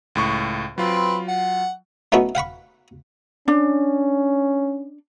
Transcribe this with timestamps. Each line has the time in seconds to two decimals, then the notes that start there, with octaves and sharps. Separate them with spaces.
0.15 C#2 A2 C#6
0.78 F#3 C4 F4 B4
1.28 F#5
2.12 A3 B3 C#4 D#4 E4 F#4
2.35 F5 F#5 B5 C#6
3.48 C#4 D4